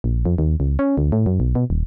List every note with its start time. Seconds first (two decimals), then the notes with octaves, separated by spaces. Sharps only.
0.04 A#1
0.25 F2
0.38 D#2
0.60 C#2
0.79 C#4
0.98 D2
1.12 A2
1.26 F#2
1.40 B1
1.55 B2
1.70 D#1